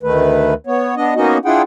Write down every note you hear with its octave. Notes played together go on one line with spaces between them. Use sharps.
D2 D#3 A3 B4
B3 C#5
B3 D4 D#5
A#3 B3 C#4 D#4 F#4 D#5
D4 E4 F4 G#4 F#5 G5